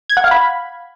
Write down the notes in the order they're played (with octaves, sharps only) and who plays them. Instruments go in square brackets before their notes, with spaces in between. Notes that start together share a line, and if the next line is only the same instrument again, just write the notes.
[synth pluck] G#6
F#5
F5
B5